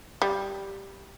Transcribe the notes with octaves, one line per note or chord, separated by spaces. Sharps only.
G3